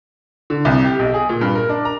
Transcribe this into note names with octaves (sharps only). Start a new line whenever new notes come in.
D3
C2
G4
B1
G#4
A#2
G2
A#4
D4
A#5